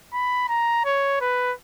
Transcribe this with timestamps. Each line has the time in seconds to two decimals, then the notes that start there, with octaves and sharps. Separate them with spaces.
0.13 B5
0.49 A#5
0.85 C#5
1.21 B4